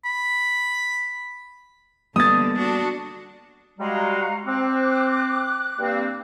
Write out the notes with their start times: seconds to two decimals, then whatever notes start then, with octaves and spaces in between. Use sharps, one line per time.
0.05 B5
2.16 D3 G3 A#3 B3 D#6 A6
2.57 D4 F#4
3.79 G3 G#3 F#4 F5 A#5
4.46 C4 D6 F#6
5.79 G2 A#3 C4